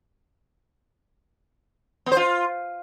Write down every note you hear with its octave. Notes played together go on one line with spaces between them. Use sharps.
B3
C5
F4